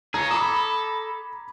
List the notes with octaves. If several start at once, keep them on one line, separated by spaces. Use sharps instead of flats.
G#4 C#5 A#5 G#6
A4 B5 D6 D#6